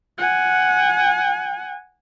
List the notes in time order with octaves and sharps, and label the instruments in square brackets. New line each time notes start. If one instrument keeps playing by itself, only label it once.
[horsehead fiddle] F#5 G#5